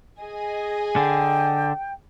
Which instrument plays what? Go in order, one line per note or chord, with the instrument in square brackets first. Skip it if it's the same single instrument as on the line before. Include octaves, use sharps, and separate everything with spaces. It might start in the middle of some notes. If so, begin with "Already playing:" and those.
[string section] G#4 D#5 G#5
[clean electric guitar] D3 [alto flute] G5